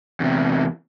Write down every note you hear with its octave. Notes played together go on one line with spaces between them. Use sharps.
E2 C3